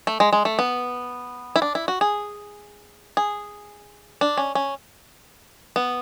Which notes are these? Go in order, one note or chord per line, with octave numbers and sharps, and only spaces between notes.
A3
G#3
G#3
A3
B3
E4
D4
E4
F#4
G#4
G#4
D4
C#4
C#4
B3